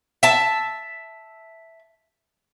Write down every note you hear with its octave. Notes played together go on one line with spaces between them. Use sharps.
E5 A5